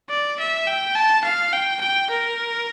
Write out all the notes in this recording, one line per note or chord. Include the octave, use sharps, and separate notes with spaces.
D5
E5
G5
A5
F5
G5
G5
A#4